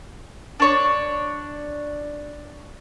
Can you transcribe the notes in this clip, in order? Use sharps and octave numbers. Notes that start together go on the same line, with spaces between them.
D4 C#5